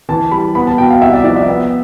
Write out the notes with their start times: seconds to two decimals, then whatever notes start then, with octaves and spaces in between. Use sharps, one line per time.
0.09 E3 A5
0.31 G3 B5
0.55 B3 B5
0.67 A5
0.78 B2 G5
0.90 F5
1.02 C2 E5
1.13 D5
1.24 F3 D5
1.36 E5
1.48 B3